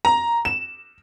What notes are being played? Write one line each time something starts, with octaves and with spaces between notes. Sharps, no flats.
A#5
E7